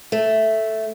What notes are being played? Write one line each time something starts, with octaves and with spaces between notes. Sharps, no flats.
A3